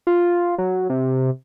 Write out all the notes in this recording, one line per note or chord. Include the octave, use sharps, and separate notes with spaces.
F4
F#3
C3